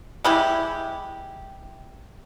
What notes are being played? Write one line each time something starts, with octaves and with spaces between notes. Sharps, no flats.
G#3 E4 G4